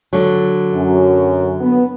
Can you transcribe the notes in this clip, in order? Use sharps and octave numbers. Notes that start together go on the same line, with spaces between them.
D3 F#3
F#2
B3